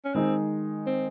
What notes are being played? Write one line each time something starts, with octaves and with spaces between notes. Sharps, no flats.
C#4
D#3 G#3 C4 D#4
C4